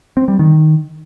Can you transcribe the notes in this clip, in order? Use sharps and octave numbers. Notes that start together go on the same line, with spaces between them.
C4
G3
D#3